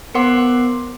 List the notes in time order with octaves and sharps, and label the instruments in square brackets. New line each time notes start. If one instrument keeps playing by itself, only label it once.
[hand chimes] B3 A#4 C5 F#5 C6 D6